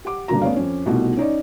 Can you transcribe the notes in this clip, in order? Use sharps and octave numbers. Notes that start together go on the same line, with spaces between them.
G4 F#5 D6
F#1 G2 D3 A#3 F#4 A#5
A3 B3 C#4 C#5 D5 F5
F2 C#4
C2 B2 A3 D#4 F4
C#4 D#4 C#5 D5